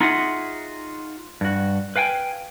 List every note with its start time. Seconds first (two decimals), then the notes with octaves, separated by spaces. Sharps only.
0.01 D#4 F4 F#4 G#4 E5 F#5
1.41 G2 F#4
1.96 B4 F5 G5 G#5